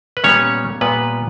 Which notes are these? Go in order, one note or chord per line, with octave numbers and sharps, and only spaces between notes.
B4
A#2 G3 B3 C#4 C#5
A#2 G3 B3 B4